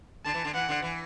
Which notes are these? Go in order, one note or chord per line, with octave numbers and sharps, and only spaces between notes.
D3 A5
E3
D3
E3 F#5
D3
E3